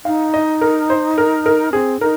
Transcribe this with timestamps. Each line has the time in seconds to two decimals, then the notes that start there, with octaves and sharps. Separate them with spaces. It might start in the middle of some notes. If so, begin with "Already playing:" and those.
0.05 D#4 F5
0.34 D#5
0.61 A#4
0.90 C5
1.18 A#4
1.46 A#4
1.73 C4 G#4
2.01 D#4 A#4